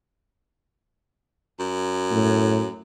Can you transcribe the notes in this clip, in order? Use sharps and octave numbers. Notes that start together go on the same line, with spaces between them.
F#2
A2